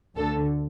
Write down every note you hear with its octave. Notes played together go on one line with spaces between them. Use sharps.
D2 D3 A4